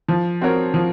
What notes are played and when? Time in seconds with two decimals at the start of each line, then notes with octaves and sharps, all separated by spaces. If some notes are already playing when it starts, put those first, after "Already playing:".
0.08 F3
0.41 C4 F#4 A#4 C#5
0.74 F3